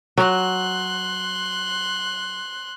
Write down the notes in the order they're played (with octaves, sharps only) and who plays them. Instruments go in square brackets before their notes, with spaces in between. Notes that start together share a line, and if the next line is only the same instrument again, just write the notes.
[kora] F#3 [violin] C6 F#6